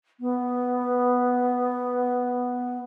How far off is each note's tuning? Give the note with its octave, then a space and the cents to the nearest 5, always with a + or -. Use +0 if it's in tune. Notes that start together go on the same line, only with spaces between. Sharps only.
B3 +0